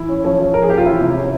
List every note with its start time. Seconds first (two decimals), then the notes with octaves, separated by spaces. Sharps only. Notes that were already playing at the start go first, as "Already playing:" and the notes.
Already playing: E3 E4
0.09 C#4
0.24 F3 C#4
0.39 F3
0.54 F3 A#4
0.62 G#4
0.70 C#4 G4
0.77 F4
0.85 E3 E4
1.01 C3
1.16 C#4